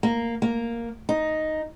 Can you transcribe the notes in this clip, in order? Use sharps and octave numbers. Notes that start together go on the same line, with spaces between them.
A#3
A#3
D#4